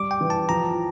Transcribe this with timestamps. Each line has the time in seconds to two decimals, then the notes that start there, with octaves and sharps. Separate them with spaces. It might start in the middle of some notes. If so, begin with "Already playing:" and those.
Already playing: G3 D6
0.11 G5
0.21 E3
0.30 A5
0.49 F3 A#5